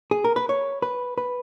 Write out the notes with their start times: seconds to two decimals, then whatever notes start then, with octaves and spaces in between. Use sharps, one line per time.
0.11 G#4
0.24 A#4
0.36 B4
0.49 C#5
0.82 B4
1.18 B4